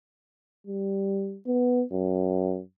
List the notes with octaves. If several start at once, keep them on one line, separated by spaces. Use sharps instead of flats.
G3
B3
F#2